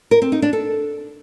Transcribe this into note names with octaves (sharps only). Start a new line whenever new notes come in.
A#4
C4
D#4
D4
A4